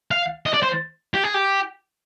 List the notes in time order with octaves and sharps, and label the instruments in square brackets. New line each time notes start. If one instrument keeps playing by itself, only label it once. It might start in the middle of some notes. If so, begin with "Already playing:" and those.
[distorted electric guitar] F5
D#5
D5
C5
G4
G#4
G4